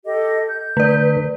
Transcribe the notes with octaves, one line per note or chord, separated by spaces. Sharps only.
G4 A4 D#5
G6
D3 A3 B4 D5